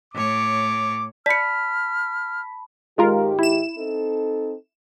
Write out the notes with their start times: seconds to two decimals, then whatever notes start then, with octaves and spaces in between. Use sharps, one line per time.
0.13 A2 C#5 D6
1.26 D5 A5 B5 F6 B6 C#7
2.98 G#2 D#3 G#3 F4 G4 A#4
3.39 E4 E7
3.77 C4 D#4 A4